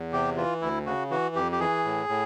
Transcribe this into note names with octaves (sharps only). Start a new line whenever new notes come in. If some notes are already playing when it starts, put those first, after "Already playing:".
Already playing: E2
C3 G4
E3 F4
D2 E4
C#3 F#4
E3 F#4
F2 G4
G4
E3 G#4
A2
A2